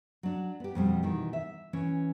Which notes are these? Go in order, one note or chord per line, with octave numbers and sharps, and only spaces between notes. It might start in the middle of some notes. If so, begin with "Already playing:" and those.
F#3 D4
B3 G4
F2 B2 G3
B2 D#3 E3
E5
E3 C#4